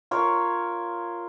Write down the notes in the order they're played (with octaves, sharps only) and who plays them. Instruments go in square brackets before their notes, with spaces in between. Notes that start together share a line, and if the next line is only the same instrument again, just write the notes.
[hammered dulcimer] F4 A#4 C#5